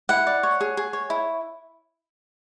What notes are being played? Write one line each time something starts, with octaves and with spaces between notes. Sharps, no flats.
E4 F#5
D5
C#5
G#4
G#4
C#5
E4